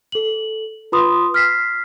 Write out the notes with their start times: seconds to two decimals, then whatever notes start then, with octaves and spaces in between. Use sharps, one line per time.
0.12 A4 F#7
0.92 F4 B4 B5 C6 D#6
1.34 F6 B6 C7